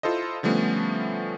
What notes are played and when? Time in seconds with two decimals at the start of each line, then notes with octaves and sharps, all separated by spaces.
0.03 E4 F4 A4 C5 D#5
0.43 D3 F3 G3 A3 B3 C#4